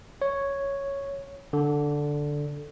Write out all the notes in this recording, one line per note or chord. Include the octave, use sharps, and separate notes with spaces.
C#5
D3